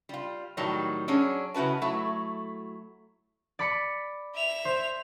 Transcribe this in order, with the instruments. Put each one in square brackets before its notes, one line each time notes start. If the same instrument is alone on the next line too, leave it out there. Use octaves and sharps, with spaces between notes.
[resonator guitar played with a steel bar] G3 F4
A2 D#3 F#3 G3
F#3 C#4 D4 G#4
C#3 E4 F#4 B4 A5
F#3 A3 E4
[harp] D5 B5 C#7
[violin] E5 F7
[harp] C5